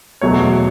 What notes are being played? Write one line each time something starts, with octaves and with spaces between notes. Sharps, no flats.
E2 B2 F#3 A3 C#5